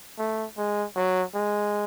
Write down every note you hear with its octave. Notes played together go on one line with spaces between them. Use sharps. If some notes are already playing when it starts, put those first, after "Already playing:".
A3
G#3
F#3
G#3